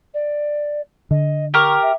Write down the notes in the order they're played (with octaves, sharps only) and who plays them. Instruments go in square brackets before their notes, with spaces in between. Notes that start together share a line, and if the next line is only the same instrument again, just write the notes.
[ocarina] D5
[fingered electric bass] D3 [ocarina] D#5
[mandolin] G4 A#4 [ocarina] C#6
[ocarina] E5